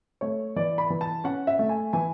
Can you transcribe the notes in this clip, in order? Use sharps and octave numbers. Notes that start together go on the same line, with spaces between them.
A3 C#5
E3 D5
B5
E3
A5
C#4 F#5
E5
A3
G#5
E3 G#5